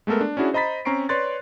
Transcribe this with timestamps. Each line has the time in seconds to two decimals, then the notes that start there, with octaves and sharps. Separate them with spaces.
0.07 G#3 A3 B3 A4 A#4
0.21 D4
0.37 C#4 D4 E4 F#4 G#4
0.53 C5 D#5 A#5 B5 A6 B6
0.85 C4 C#4 A#5 C#6 C7 D7
1.09 B4 C#5 D5 C6 F#6 A6